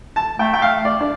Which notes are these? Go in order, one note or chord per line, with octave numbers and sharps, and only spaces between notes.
A5
A3 G5
G5
F5
D5
D4